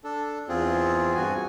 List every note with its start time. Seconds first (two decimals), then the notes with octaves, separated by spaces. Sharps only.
0.04 D4 A4
0.49 E2 C4 F4 G#4
1.15 G2 F#4 G#5